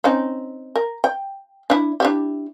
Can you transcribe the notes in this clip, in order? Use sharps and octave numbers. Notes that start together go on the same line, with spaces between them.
C4 C#4 D#4
A#4
G5
D4 E4
D4 E4 G4